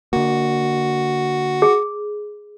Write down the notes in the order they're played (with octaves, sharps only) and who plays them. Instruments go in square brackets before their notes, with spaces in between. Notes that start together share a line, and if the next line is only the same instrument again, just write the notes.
[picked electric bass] D3 A#3 [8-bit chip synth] F#4
[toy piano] G#4